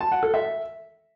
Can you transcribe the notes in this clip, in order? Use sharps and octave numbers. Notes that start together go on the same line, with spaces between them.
A5
F#5
A4
E5